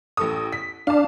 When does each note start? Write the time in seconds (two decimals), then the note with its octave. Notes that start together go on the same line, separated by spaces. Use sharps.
0.17 A1 A4 D#6
0.53 B6
0.87 D4 F5 A5